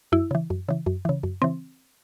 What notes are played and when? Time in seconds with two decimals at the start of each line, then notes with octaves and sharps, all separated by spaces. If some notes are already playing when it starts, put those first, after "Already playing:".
0.12 F#2 E4
0.31 C#3 E3
0.50 F#2
0.69 C#3 E3
0.86 F#2
1.05 C#3 E3
1.23 F#2
1.42 C#3 E3 C4